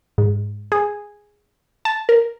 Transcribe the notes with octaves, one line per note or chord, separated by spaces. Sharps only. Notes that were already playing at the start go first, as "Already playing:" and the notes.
G#2
G#4
A5
A#4